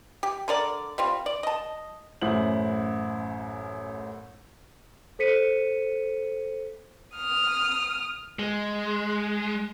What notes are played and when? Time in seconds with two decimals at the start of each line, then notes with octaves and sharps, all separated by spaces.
0.23 G4
0.48 D3 A#4 D5
0.98 G3 C4 F4
1.26 D5
1.43 D#5 A5
2.22 A1 F#2 E4 C5 F#7
5.19 A4 C5 B6 C#7 D#7
7.15 D#6 F6
8.39 G#3